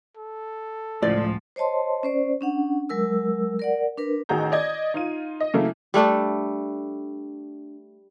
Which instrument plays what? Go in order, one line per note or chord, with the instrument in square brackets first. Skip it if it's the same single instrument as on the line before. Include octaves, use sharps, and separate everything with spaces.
[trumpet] A4
[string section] C#2 F3 [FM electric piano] A2 [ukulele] D5
[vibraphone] C5 C#5 D#5 A5 C6
C#4 C5 D5
C#4 D4 F#5
F#3 G#3 A#4 E6
A#4 D5 F#5
D4 A#4 B4
[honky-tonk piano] A1 D#3 F#4 G#4 A#5 G6
D5 D#5 G#6
D#4 F4 D#7
D#5
C#3 F#3 A3 A#3 E4
[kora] G3 A3 D4 A4